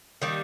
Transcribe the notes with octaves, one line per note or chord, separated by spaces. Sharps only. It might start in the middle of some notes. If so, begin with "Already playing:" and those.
D#3 G3 A#3